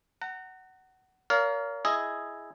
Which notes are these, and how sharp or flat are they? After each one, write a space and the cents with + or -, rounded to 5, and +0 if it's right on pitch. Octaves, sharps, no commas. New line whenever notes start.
F#5 +20 A#5 -30
A#4 +0 C#5 +45 F5 +0
E4 +0 G#4 +0 D#5 +0